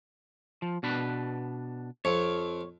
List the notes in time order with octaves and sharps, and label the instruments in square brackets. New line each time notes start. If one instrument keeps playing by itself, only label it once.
[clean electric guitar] F3
B2 D4 B4
[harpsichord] F2 [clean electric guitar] C#5